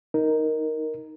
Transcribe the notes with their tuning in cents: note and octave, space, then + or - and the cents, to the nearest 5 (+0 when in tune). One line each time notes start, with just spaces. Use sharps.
D#4 +5 A#4 +0